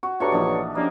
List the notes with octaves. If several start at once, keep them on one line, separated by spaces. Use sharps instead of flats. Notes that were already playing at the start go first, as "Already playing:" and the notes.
F#4 C#6
G2 A3 D4 F#4 C#5 A#5 C#6
A#1 E3 D4 D#4
C3 F3 A#3 C#4 D4 D#5 A#5